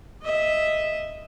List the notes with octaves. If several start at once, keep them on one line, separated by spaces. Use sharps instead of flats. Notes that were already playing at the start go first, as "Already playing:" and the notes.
D#5 E5